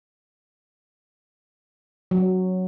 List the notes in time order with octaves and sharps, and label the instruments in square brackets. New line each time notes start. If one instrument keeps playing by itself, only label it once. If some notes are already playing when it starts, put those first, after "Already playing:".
[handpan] F#3